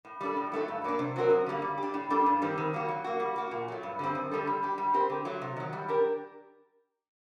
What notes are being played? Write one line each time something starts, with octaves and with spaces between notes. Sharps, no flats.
A2
G3 D4 A4
A2
F#3 A3 D#4 A4
G2
F#3 A#3 D4
C3
F#3 C4 F#4 A#4
F#2
D3 G3 A#3
G3
D4 G4
A2
G3 D4 A4
G2
D#3 G3 C4
D#3
G3 A#3 F#4
F#3
A#3 F#4
G3
A#3 F#4
A#2
F#3 A3
G2
D3 G3 C4
F#2
D3 G3 D4 A4
G3
D4 G4
G3
C4 G4 A#4
D3
F#3 A3
C3
D#3 F#3
G3
D4 G4 A#4